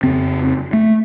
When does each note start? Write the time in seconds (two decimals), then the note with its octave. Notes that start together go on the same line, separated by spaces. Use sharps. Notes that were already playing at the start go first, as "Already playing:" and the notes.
0.03 F2 C#3 C4
0.73 A3